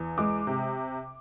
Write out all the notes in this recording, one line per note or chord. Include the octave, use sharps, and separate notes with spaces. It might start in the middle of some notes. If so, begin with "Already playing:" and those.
Already playing: E2
G#3 D6
C3